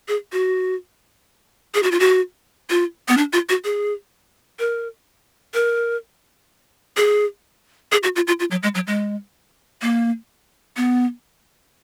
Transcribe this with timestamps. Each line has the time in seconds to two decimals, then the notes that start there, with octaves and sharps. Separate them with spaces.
0.08 G#4
0.32 F#4
1.74 G#4
1.83 F#4
1.91 F4
2.00 F#4
2.70 F4
3.08 B3
3.17 D4
3.33 F4
3.49 F#4
3.64 G#4
4.59 A#4
5.54 A#4
6.97 G#4
7.92 G#4
8.03 F#4
8.16 F4
8.27 F4
8.40 F4
8.51 F#3
8.63 G#3
8.75 F#3
8.87 G#3
9.82 A#3
10.77 B3